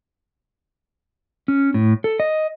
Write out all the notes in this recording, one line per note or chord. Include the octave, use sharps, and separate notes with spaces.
C#4
A2
A4
D#5